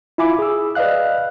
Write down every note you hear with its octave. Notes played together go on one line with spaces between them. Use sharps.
E4 F4 E5 G#5 B5 D6
G#4 E6
B4 D5 D#5 F5 F#6